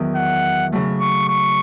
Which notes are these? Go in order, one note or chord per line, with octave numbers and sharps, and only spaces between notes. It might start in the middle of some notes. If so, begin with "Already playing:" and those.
Already playing: E2 D#3 F#3
F#5
C#3 F#3 A3
C#6
C#6